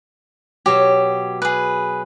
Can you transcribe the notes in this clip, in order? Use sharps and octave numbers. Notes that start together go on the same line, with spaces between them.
B2 F#3 G4 C#5
G#4 B4